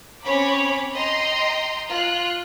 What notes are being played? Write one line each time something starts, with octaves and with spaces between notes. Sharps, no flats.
C4 C#4 C#5 B5 D6
D#5 G5 A#5 C6 C7
F4 F#6